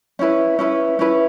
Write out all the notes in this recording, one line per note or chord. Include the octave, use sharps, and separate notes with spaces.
C#4 E4 B4
C#4 E4 B4
C#4 E4 B4